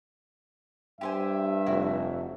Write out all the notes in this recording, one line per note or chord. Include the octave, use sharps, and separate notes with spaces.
G2 G4 C5 E5 G#5
F1 E4 F#4